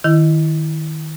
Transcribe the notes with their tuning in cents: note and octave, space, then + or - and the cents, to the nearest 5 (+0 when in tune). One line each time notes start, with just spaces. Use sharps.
D#3 +0 E4 +10